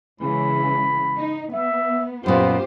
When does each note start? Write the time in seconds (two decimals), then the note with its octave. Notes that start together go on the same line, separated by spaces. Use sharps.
0.21 C#3 E3 G#3 B5
1.16 D#4
1.53 B3 E5
2.26 F#2 A#2 B3 F4 G4 C5